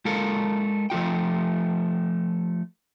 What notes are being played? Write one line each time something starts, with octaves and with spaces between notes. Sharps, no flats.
G#3 F4 A4 A#4 F5
F3 A3 F4 G5